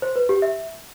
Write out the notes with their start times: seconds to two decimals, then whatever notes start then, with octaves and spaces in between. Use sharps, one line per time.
0.02 C5
0.16 B4
0.29 G4
0.42 E5